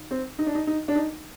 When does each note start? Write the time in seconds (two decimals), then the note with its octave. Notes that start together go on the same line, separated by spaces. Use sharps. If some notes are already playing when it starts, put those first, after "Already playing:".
Already playing: D#3
0.11 C4
0.39 D#4
0.46 D4
0.55 D#4
0.67 D#4
0.88 D4
0.95 D#4